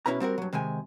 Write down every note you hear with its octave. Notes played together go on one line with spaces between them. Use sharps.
B2 C#4 E4 B4 A#5
G3 C4 F#4 A#4
G2 F#3
C3 D#3 G#3 G#5